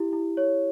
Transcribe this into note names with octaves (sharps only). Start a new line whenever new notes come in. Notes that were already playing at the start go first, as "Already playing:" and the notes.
Already playing: E4 G4
E4
C#5